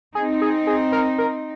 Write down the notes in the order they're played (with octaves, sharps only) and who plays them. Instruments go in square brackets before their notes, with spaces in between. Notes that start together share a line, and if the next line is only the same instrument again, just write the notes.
[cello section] C4 D#4 [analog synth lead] G#4
[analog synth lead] G#4
G#4
A#4
A#4